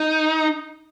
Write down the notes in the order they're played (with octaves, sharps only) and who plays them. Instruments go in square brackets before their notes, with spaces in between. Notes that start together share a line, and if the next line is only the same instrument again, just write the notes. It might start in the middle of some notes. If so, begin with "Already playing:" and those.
Already playing: [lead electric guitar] D#4